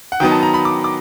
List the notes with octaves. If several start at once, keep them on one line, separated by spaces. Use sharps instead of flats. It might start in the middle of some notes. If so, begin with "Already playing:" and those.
F#5
D#3 F#3 B3 D#4 G5
A5
A#5
B5
D6
D6